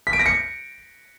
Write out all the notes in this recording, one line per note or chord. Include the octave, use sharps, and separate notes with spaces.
B6
D7
A#6
C#7